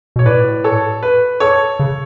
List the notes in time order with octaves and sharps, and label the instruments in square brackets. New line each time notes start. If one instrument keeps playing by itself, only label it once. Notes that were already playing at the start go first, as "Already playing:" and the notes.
[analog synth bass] B2 [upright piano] C#5
[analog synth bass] A2 [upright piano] B4 D5
[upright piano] A4 C#5
B4
A4 C#5
[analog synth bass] C#3